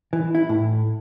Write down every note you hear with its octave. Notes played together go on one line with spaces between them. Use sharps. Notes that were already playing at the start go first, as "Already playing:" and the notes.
E3
E4
A2